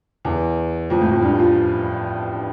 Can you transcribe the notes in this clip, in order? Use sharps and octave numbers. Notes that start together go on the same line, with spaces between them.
E2
F2
A2
F2
G2
F3